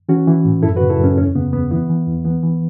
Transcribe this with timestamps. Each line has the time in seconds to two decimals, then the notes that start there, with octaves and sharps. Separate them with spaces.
0.09 E3 C#4 F#4
0.28 E3
0.45 A2
0.63 F#2 E4 A4
0.76 F#4 B4
0.81 C#3
0.90 E4 A4
0.99 F#2 C#4
1.17 E2 C#4
1.35 C#3 B3
1.53 E2 B3
1.71 E3 B3 E4
1.89 E3
2.07 E2
2.25 E3 B3
2.43 E3